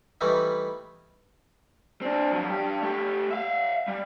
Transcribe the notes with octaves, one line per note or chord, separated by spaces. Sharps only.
E3 G3 A3 B3 D#4
C4 D4
F3 F#3
G2 G4
A3 G4
E5 F5
G3